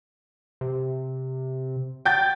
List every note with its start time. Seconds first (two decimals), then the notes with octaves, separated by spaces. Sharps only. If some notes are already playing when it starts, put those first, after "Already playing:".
0.61 C3
2.05 G5 G6 A6